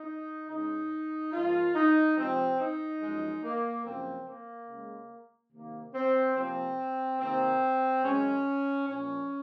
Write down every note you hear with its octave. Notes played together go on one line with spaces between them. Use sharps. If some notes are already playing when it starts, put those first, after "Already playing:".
Already playing: D#4
C#3 G#3 D#4
G#2 F3 A#3 F4
D#4
C3 F3 G#3 C4
D#4
F#2 F3 G#3
A#3
F#2 C#3 F3 A#3 C4
A#3
C#3 G#3
C3 D#3 A#3
C4
C3 F3 A#3 C4
C3 D#3 A#3 C4
F#2 C#3 G#3 C#4
A#2 F3 A#3 C#4